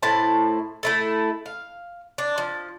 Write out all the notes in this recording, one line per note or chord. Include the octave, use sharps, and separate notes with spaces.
A2 E4 C5 A5
A3 E4 A4
F5
D4
F3